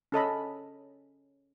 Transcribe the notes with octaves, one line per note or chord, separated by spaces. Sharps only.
C#4 A4 D#5 B5